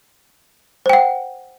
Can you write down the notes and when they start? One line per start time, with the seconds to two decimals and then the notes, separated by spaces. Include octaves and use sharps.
0.86 C5
0.89 G5
0.93 F#5